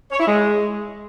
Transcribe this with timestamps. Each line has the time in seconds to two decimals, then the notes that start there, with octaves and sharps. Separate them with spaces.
0.12 C#5
0.20 E4
0.28 G#3